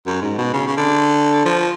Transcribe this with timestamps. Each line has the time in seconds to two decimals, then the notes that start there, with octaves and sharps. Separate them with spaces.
0.07 F#2
0.22 G#2
0.38 B2
0.53 C#3
0.67 C#3
0.77 D3
1.45 F3